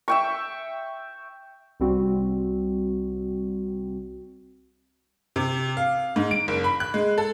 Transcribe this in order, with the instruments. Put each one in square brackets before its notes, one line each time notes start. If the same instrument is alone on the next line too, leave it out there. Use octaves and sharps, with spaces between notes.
[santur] E5 G5 C#6
[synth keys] C2 G3 C4 F#4
[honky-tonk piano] C3
F5
G#2
D7
F#1
B5
F#6
G#3
A4